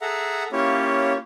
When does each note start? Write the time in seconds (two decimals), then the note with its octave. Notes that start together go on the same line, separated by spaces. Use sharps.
0.01 G#4 A4 E5 F#5 A#5
0.52 A#3 C#4 E4 F4 G4 C#5